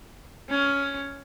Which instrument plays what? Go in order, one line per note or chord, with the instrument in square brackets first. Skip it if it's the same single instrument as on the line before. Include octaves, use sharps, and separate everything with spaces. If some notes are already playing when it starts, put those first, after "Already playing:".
[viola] C#4